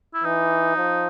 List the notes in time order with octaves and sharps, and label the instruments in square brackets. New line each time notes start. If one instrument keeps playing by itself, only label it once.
[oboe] E4
[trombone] E3 [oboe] D#4
[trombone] F3